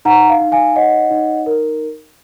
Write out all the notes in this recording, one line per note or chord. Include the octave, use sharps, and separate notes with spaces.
D#4 F#5 A#5
F5
D#4
F5 G#5
C#5 D#5 F#5
D#4
A#4